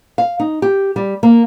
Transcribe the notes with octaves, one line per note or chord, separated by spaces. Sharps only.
F5
D#4
G4
G3
A#3